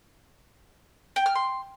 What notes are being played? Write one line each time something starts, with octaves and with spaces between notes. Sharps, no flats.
G5
F6
C6